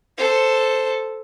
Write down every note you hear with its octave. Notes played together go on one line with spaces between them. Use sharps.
A4 C5